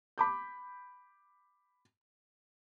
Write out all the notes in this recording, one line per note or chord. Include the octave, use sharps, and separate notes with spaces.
B5 D6 G6